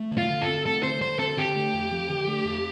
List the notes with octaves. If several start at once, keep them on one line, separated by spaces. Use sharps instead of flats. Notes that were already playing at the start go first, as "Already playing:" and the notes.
Already playing: A3
D3
F4
D3
A4
C4
A3 A4
D3 C5
D3 C5
C4 A4
D3 G4
A3
F2
F3
D3
A3
F2